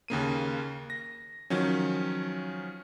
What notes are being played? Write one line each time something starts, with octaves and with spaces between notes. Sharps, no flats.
D#2 C#3 A#3 D#7
A#6
D#3 F3 F#3 C#4